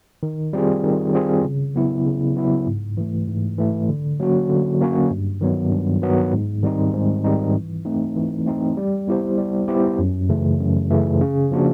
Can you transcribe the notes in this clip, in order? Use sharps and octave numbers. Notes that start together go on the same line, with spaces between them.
D#3
G3 C4 F4 G#4
D#3
G3 C4 F4 G#4
C#3
F#3 B3 E4
C#3
F#3 B3 E4
G#2
E3 A3
G#2
E3 A3
D3
F#3 A#3 C#4 F#4
D3
F#3 A#3 C#4 F#4
G2
D#3 F#3 B3
G2
D#3 F#3 B3
G#2
D#3 G3 C4 D#4
G#2
D#3 G3 C4 D#4
E3
A3 C4 D#4
E3
A3 C4 D#4
G3
B3 E4 G4 C5
G3
B3 E4 G4 C5
F#2
C#3 E3 A3
F#2
C#3 E3 A3
C#3
F3 A#3 D4 F#4